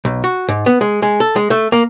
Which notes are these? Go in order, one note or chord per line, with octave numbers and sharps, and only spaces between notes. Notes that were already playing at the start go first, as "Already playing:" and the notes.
B1
F#4
G#2
B3
G#3
G#3
A4
G#3
A3
A#3